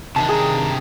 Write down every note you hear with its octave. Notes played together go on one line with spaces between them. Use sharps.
C3 D#3 D4 A5
G#4 G5 A#5